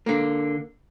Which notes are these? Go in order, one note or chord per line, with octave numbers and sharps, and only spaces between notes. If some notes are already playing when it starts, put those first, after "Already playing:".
D3 A#3